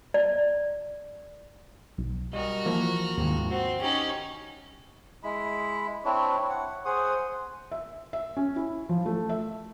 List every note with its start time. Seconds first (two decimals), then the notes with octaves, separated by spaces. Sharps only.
0.14 D5
1.98 B1
2.33 G3 F#4 A#4 D#5
2.66 E3 F3 A#3
3.17 D#2 G#2 C3 F3
3.50 C4 F#4
3.81 C#4 D#4 G4
5.24 G#3 E4 B5
6.05 C4 D4 E4 C#5
6.50 F#5
6.85 G#4 C5 F#5 D#6
7.72 E5
8.13 E5
8.37 C#4
8.56 E4
8.89 F3
9.06 A3
9.29 E5